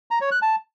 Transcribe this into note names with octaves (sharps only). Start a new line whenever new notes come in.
A#5
C#5
F#6
A5